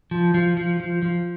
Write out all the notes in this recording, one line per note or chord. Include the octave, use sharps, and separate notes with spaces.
F3
F3
F3
F3
F3